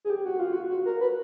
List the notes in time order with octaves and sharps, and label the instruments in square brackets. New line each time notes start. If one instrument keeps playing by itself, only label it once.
[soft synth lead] G#4
G4
F#4
F4
F#4
F#4
A#4
B4